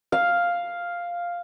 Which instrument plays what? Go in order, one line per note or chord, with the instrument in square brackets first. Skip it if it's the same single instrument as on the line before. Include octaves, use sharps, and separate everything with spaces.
[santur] F5